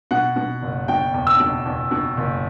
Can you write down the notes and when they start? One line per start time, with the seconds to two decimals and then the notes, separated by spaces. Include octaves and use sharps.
0.11 B2 F#5
0.36 B2
0.63 F#1
0.88 B2 G5
1.14 E2
1.27 E6
1.40 B2
1.66 E2
1.91 B2
2.17 F#1